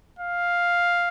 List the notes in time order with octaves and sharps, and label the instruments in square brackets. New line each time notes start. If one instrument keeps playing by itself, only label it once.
[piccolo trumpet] F5